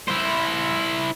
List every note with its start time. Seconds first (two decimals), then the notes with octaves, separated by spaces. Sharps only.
0.08 E4 C5